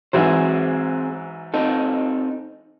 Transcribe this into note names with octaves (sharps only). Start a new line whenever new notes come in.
G#2 E3 F#3 C4 G#4 C5
C4 D#4 A4